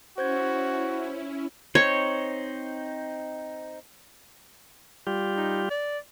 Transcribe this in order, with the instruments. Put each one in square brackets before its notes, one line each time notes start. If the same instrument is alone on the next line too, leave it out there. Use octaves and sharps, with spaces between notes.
[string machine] C#4 E4 [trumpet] F#4 [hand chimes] C5 G6 G#6
[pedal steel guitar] C4 D#4 C5 [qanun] C#5
[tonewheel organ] G3 F4 G4
[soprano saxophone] D#4
D5